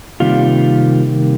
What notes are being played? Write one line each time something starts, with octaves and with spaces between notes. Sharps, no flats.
C3 D#3 G3 A#3 F4